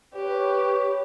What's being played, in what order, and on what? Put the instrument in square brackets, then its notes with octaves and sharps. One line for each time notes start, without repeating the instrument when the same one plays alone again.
[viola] G4 [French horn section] B4 C#5